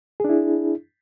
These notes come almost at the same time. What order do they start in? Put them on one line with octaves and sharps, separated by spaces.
G#4 D4 E4